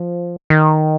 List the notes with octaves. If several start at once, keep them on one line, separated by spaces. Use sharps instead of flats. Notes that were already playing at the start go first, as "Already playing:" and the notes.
Already playing: F3
D#3